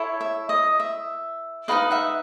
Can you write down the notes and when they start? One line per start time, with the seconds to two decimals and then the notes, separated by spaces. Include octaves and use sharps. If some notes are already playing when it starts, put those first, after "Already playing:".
Already playing: E4 A4 C#5
0.21 E5
0.49 D#5
0.80 E5
1.68 D#4 F#4 B4 D#5 F5
1.91 E5 F#5